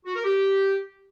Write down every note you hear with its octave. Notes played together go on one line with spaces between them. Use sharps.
F#4
A#4
G4